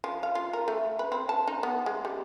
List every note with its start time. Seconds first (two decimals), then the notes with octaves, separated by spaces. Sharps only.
0.04 F3
0.23 F5
0.35 F4
0.53 A#4
0.68 A3
0.99 B4
1.12 C4
1.29 A5
1.47 D#4
1.63 B3
1.86 G#3
2.05 G3